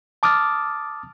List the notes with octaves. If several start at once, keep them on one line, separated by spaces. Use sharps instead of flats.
A5 D6 D#6 F6 A6